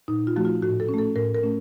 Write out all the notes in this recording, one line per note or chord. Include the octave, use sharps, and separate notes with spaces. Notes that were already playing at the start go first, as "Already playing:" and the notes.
A#2 D#4
F4
F3 A3 F#4
F4
A2 F#4
A4
C#4
A3 A4
A2 A#4
A#4
A3 C#4